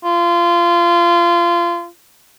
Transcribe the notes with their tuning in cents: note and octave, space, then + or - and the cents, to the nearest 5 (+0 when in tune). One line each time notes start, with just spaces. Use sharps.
F4 -25